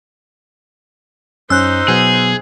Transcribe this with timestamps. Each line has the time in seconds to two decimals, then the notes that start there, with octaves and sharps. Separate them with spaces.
1.50 F#2 C#4 D#4 C5 E6 F#6
1.88 B2 F#3 B3 G#4